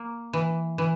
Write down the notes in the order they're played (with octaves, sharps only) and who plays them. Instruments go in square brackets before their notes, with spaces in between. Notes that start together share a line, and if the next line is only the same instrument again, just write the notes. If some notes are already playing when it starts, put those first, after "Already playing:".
Already playing: [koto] A#3
E3
E3